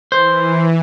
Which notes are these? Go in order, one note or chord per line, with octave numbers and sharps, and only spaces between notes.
E3 C5